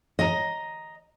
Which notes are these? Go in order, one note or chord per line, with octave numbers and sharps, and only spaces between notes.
D#5 A#5